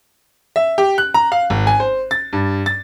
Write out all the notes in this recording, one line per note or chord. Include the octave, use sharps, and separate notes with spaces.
E5
G4
F#6
A#5
F5
G#1
G#5
C5
A6
G2
A6